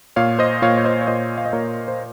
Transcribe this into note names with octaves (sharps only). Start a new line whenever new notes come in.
A#2 C#5 F5
C5 D#5
A#2 C#5 F5
C#5
C5 D#5
C#5
A#2 C5 D#5
F5
D#5
A#2 A#4 C#5
C5